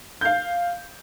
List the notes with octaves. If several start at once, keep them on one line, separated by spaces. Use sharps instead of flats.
F5 G6